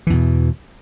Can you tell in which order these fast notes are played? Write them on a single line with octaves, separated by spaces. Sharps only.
E3 E2 B2